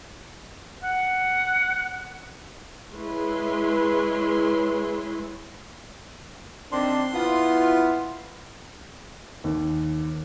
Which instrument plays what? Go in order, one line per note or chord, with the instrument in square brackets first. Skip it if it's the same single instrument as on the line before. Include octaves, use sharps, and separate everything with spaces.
[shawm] F#5
[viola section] G#3 E4 B4 C#5 C6
[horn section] D#3 C4 D4 [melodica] C6
[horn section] B3 E4 F4
[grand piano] D#2